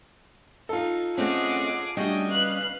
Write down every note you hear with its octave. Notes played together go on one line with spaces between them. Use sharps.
D#4 F4 A4
A3 C4 C#4 G#4 D#5 F#5 D6
G3 A3 C#4 D4 F#4 D#5 G5
B4 F5 F#6